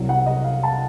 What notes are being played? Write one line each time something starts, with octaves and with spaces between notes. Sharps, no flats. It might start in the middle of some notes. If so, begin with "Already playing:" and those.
Already playing: C2 C3 F#3
F#5
D#5
F5
A5